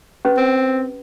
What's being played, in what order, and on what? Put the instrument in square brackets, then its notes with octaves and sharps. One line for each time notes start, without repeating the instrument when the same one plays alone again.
[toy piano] C#4 G4 B4
[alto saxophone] C4